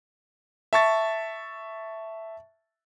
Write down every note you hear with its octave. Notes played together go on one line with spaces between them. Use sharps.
E5 A5 C#6 A6